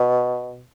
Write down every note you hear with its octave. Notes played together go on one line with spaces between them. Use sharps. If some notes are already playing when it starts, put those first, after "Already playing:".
Already playing: B2